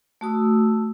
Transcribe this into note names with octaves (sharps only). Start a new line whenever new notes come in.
A3 F#4 D#6 E6